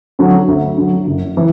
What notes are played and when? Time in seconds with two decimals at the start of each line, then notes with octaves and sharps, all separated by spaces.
0.19 D3 F#3
0.48 D2
0.77 D3 F#3
1.07 F#1
1.37 E3